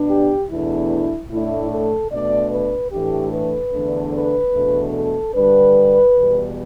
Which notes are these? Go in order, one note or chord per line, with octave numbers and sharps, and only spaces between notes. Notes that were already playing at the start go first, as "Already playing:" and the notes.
Already playing: B2 B3 D4
G4
E2 B2 A3 D4 E4
A2 A3 D4 E4
A4
B2 A3 D4 D5
B4
A2 E3 A3 D4 G4
B4
E2 D3 A3 D4
B4
E2 B2 A3 D4
A4
G2 D3 G3 D4 B4
E2 B2 G3